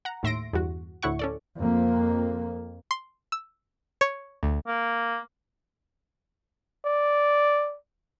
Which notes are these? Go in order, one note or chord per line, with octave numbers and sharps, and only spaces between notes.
F#5 A#5
D#2 A2 E5 C6 A#6 D7
E2 G2 F#4
D2 A2 E4 F#5 C#6
C#4 A4 D5
F2 A#3
C6
E6
C#5
D2
A#3
D5